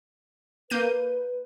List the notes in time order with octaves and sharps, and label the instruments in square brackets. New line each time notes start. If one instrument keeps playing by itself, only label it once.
[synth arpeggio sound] A#3 G6 D#7 [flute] B4